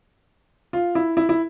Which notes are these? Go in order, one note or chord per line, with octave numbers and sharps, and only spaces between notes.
F4
E4
E4
E4